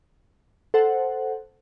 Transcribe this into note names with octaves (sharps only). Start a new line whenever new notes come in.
A4 C5 F#5